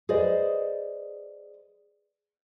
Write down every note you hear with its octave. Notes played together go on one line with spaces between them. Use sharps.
G#4 B4 C5 D5 D#5